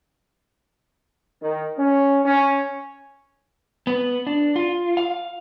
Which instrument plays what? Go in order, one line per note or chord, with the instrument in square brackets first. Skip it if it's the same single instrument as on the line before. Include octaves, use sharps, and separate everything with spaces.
[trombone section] D#3
C#4
C#4
[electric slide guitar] B3
D4
F4
F5